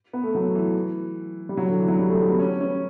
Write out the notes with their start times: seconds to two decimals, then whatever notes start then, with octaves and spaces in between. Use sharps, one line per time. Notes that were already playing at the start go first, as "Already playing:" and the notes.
0.13 B3
0.23 A3
0.35 F#3
0.55 E3
1.49 G3
1.57 F#3
1.68 D3
1.79 E3
1.88 F#3
1.99 G3
2.10 A3
2.20 G3
2.29 B3
2.40 C#4
2.61 C#4